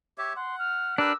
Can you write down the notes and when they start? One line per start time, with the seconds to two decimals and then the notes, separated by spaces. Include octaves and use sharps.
0.18 G4 C#5 E5
0.36 F#5 C6
0.59 F6
0.98 D4 G4 A#4 B4 E6